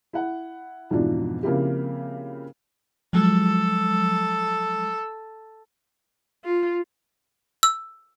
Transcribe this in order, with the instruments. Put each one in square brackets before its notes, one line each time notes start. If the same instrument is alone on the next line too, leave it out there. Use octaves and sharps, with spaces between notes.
[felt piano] E4 F#5
F2 G#2 B2 E3 F3 D4
C#3 F3 A#3 C4 E4 G4
[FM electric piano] F3 F#3 G#3 [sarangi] A4
[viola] F4
[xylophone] E6